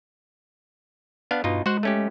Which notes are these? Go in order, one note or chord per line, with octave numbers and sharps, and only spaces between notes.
B3 D4 F5
G2 B2 D#4 F4
G#3 F#4 C5 F#5
A3 C#4 G4